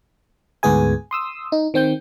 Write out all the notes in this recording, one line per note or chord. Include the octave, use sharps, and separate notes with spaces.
D2 G#2 B3 G#4 G#5
C6 D#6 E6
D#4
D#3 C4 G5 G6